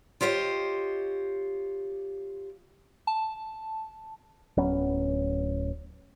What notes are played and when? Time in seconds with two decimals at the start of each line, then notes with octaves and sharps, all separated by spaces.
0.21 F4 G4 C5 C#5 D#5
3.07 A5
4.57 D1 F#3 B3 C#4